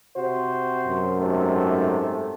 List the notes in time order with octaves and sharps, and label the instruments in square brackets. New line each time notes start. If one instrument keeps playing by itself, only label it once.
[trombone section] C3 F#4 C5
[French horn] F#2
[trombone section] G#2 C3 A3